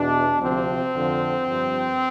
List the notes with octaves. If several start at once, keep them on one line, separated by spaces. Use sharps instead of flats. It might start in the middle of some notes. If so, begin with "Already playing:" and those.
Already playing: E2 B2 D4
D2 C3 F3 C4
F2 D3 F3
G2 F3